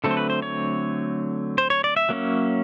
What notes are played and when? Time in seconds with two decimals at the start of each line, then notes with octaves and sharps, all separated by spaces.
0.04 D3 F#3 A3 C4 A4
0.11 C5
0.17 B4
0.30 C5
0.42 C#5
1.58 C5
1.70 C#5
1.84 D5
1.96 E5
2.09 F#3 A#3 C#4